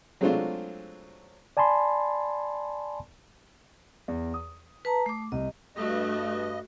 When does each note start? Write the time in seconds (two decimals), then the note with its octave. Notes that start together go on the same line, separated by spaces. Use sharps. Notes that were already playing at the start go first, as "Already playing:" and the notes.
0.21 F#3 G#3 A3 C4 D4 F4
1.57 D5 G#5 A5 B5 C6
4.08 E2
4.34 D#6
4.85 B4 A5 A#5
5.06 A3 D6
5.32 C2 D#5
5.76 G2 A3 F#4 D#5